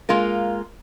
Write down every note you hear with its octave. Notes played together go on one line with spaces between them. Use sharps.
G#3 A#3 F4 A#4